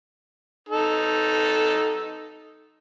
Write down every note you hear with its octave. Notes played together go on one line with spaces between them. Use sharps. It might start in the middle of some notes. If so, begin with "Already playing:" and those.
D#4 A4